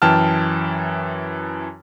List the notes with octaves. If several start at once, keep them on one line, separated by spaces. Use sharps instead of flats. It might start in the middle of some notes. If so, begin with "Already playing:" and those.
F#2 E3 G5 A5 F6